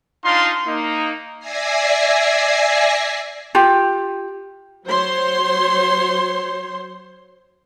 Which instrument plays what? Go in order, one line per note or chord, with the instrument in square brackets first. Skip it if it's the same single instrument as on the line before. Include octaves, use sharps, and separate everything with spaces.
[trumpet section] D4 D#4 F4 F5 C6
A#3 D#4
[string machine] D5 E5 G#5 G#6 A#6 C7
[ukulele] F4 G4
[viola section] F#3 C5 C#5 C6